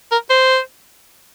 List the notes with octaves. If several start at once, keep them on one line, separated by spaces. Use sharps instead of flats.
A#4
C5